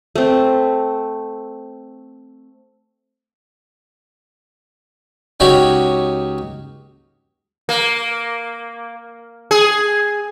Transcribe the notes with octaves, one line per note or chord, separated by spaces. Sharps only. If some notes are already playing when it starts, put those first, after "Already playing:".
A3 C4
C#2 D#4 F#4 G4 C#5 B5
A#3
G#4